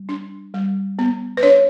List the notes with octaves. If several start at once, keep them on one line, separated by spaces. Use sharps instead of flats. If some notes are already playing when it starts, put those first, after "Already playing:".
Already playing: G3
D4
G3
B3
B4
D4 C#5